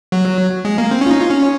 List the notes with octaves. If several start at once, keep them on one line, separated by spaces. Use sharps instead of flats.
F#3
G#3
A#3
C4
C#4
F4
D#4
F4
C#4